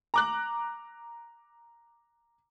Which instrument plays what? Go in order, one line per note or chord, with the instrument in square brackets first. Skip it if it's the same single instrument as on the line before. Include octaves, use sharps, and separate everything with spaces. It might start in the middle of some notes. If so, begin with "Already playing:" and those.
[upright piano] A#5 D6 F#6